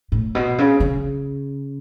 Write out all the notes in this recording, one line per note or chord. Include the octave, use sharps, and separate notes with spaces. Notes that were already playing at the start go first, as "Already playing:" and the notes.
A2
B2
C#3
C#3